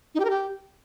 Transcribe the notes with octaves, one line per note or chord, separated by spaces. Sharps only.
D#4
G4
A#4
G4